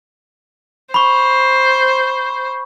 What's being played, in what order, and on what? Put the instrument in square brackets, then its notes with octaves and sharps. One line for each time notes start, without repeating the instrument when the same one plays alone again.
[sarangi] C5 [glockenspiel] B5 C#6